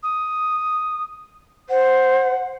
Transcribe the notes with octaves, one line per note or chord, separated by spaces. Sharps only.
D#6
C5 F#5